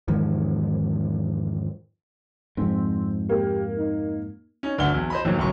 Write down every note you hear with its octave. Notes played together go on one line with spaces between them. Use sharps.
E2 G#2 D#3 F3
F2 G#2 C4
A#3 G4
D#4
C#4 D#4
G1 D2 D4 F#5 G7
B1 E2
C5 D#5 B5
A#1 D#2 A2 D#3 E3 F#3
F#1 A2 C3 F#3 C#6